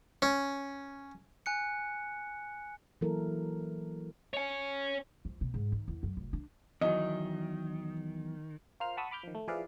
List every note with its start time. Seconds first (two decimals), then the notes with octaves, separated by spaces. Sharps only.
0.22 C#4
1.46 G#5 F#6 C#7
3.01 E3 F#3 A#3 E4 A4 A#4
4.33 C#5 G#5
5.25 F2
5.41 B2
5.54 G#2
5.72 D#3
5.88 E2
6.03 F#2
6.17 F1
6.33 D4
6.81 E2 D#3 E3 F#3 D#5
8.80 F4 A#4 C5 F5 F6
8.97 F#5 A5 B5 C#6 D#6 E6
9.11 B5 D6 F6 G6
9.23 D#3 F3
9.35 A3
9.48 F3 E4 G#4 B4 D5 F5